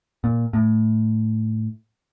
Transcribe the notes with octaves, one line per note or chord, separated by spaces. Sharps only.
A#2
A2